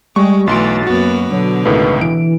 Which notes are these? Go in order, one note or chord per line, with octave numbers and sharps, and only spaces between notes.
G3 G#3 C#6
B1 E3 A3 F#4 C6 A6 D7
F#2 A#3 B3 F#4
B2 D3 F#3
C#2 A2 D#3 B4
E3 D7